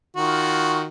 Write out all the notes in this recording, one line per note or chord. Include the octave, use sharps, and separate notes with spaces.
D#3 F4 F#4